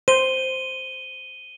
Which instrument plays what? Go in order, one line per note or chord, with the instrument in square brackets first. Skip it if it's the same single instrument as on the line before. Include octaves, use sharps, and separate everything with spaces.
[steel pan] C5 [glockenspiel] D#7 G7